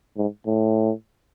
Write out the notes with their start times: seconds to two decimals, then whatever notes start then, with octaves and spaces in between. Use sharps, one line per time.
0.17 G#2
0.47 A2